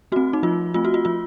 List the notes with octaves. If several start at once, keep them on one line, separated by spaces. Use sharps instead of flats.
A3 C4 F#4
D#4
F3 F4
A3 C4 F4
F#4
F4
F3 F4